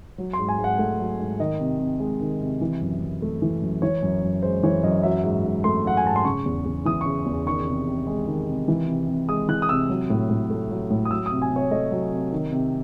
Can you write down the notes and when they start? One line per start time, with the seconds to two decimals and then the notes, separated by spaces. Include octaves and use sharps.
0.18 F#3
0.33 G#2 C6
0.48 G#5
0.59 G#2
0.64 F#5
0.79 A3
0.99 F#3
1.20 G#2
1.39 D#3 D#5
1.60 C3
1.79 C3
2.00 G#3
2.21 D#3
2.41 C3
2.61 E3
2.81 F#2
3.02 F#2
3.22 A3
3.42 E3
3.62 F#2
3.82 E3 C#5
4.03 F#2
4.23 F#2
4.42 G#3 C5
4.63 E3 C#5
4.83 F#2 D#5
5.03 F#3 E5
5.24 G#2
5.44 G#2
5.64 A3 C6
5.84 F#3 F#5
5.97 G#5
6.05 G#2 A5
6.16 C6
6.25 C#3 C#6
6.46 E2
6.66 E2
6.85 E3 D#6
7.01 C#3 C#6
7.26 E2
7.46 D#3 C#6
7.67 C3
7.87 C3
8.07 G#3
8.27 D#3
8.47 C3
8.68 E3
8.88 C3
9.08 C3
9.28 G#3 D#6
9.48 E3 F#6
9.62 D#6
9.69 C3 E6
9.90 F#3
10.10 A2
10.30 A2
10.50 A3
10.71 F#3
10.90 A2
11.05 D#6
11.10 F#3 E6
11.26 D#6
11.31 C3
11.42 G#5
11.51 C3 C#5
11.71 A3 D#5
11.91 F#3
12.12 C3
12.32 D#3
12.52 C3